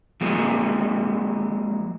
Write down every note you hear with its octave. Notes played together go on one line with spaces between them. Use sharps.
F3 F#3 G#3 A#3